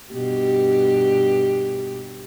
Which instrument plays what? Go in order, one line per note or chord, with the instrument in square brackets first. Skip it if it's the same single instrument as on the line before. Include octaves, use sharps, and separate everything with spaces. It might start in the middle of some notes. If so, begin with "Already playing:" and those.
[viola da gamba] G2 B2 G4